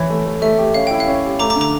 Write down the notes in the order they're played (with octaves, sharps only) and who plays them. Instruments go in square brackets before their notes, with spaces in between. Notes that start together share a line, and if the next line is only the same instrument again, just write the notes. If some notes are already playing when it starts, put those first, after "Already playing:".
Already playing: [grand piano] E3 [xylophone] C#5
[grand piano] A3
A3
[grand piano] A3 [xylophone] E5
[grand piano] G4
[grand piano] C#4 [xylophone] F5
[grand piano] E4 [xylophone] G5
[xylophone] F5
[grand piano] C#4
G4
[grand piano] A3 [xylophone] A#5 D6
[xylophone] A#5 D6
[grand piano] D3
[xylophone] A#5 D6